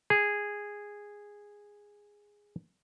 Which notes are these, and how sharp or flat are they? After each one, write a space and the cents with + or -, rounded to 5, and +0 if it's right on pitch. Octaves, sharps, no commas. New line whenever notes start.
G#4 -10